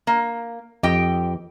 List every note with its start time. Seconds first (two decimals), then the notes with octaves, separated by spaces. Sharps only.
0.07 A#3
0.83 F2 G4 D#5 G5